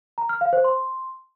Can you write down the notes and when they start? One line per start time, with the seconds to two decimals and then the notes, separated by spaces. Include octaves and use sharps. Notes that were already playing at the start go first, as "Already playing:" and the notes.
0.18 A#5
0.29 F6
0.41 F5
0.53 C5
0.64 C6